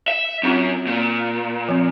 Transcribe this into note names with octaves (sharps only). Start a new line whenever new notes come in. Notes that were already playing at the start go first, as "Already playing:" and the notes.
E5
F#2 C4 D4 F4
A#2
F3 C4